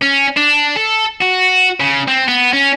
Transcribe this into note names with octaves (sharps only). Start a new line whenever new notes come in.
C#4
D4
A4
F#4
C#3
C4
B3
C#4